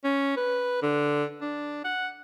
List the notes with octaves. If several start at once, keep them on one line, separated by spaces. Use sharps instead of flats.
C#4
B4
D3
D4
F#5